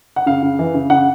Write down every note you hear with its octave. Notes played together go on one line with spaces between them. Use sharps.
F#5
C#3 F5
C#3
E3
C#3
C#3 F#5